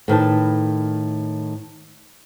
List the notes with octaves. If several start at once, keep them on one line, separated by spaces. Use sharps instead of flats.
A2 D#3 B4 A5